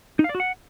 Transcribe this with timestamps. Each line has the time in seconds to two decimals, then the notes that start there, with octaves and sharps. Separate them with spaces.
0.19 D#4
0.24 F5
0.29 D5
0.35 F#4
0.40 F#5